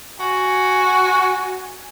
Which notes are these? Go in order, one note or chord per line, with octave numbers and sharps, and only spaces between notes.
F#4 G#5